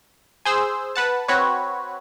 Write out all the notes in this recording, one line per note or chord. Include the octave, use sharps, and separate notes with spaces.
G#4 C5 E6
B4 F#5 A5
C4 F#4 B4 C#5